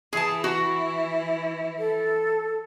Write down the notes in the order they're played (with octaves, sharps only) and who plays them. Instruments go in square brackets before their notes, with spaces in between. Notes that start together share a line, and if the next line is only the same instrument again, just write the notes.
[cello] E3 E4 [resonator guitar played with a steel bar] G#4 A5
[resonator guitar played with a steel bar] F#4
[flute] A4